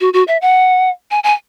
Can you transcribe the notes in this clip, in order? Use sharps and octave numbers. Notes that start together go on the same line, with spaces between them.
F#4
F#4
E5
F#5
G#5
G#5